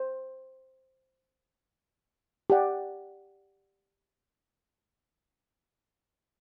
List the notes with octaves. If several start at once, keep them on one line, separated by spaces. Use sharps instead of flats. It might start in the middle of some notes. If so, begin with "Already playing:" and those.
Already playing: C5
G4 D5 F#5